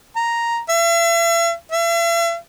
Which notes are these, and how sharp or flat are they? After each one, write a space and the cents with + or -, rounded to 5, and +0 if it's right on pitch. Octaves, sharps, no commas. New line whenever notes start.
A#5 +0
E5 +40
E5 +45